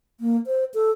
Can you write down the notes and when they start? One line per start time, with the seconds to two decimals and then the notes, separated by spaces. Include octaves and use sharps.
0.20 A#3
0.47 C5
0.74 A4